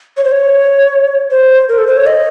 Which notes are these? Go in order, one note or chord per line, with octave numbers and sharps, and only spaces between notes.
C#5
C5
C#5
C5
A#4
A4
C5
C#5
D#5